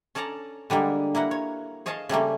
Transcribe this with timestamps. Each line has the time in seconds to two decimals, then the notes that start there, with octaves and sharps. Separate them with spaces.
0.15 C#4 A4 D5 A5 A#5
0.70 D3 G3 G#3 A#3
1.15 A#3 E4 A#4 F#5
1.31 C#5
1.86 G#4 C#5 D#5 F5 A5
2.09 C#3 G3 A3 A#3